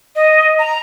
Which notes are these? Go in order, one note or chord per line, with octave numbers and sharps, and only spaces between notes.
D#5
A#5